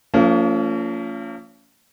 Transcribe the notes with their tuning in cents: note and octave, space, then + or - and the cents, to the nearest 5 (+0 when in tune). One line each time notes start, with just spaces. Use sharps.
F3 +0 A#3 -40 C#4 +35